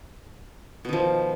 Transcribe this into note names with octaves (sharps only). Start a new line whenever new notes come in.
B2 D#3 F3